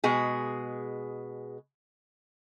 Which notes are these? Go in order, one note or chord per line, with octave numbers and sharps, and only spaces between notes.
B2 G#3 G#4